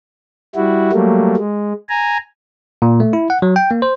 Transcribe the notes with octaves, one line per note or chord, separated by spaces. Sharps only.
G3 E4 F#4
F#3 G3 A3 A#3
G#3
G#5 A#5
A#2
A3
E4
F#5
F#3
G5
A#3
C5